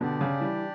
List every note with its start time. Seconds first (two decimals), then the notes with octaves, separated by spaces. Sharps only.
0.01 B2 D3 D4 G4 D5
0.21 C#3
0.40 E3 G3